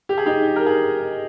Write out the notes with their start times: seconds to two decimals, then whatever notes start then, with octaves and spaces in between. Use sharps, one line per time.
0.09 G4
0.18 G#4
0.26 D#4 G4
0.56 A#4
0.66 G#4